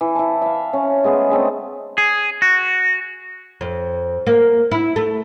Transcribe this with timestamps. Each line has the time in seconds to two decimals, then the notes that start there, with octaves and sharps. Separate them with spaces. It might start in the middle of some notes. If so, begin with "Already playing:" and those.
0.01 E3
0.16 E4 A5
0.42 E5 F5
0.73 C#4
1.04 G#3 A3 B3 G#4
1.30 D3 G#3 A3 C4
1.98 G#4
2.42 F#4
3.61 F2
4.27 A#3
4.71 E4
4.96 A3